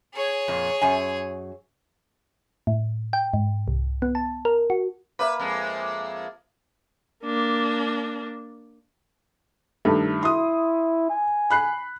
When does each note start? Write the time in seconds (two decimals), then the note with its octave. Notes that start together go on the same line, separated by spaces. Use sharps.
0.15 G#4 C#5
0.48 F2 A#2
0.82 F#2 G#5
2.67 A2
3.13 G5
3.34 G#2
3.68 C2
4.02 B3
4.15 A5
4.45 A#4
4.70 F#4
5.19 A#3 B4 D5 E5
5.40 F2 G#3
7.24 A#3 D4
9.85 G2 D#3 A3
10.23 E4 C6 D#6
11.10 G#5
11.50 B5 F#6 C7